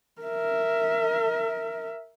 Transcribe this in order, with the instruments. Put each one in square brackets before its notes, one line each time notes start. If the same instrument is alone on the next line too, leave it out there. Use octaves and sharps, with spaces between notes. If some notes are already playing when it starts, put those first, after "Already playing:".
[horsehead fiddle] A#4 E5